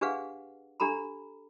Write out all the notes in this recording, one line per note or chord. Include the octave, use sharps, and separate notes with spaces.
D4 G4 G#4 B4 F5 F#5
D4 G4 A4 A#5 B5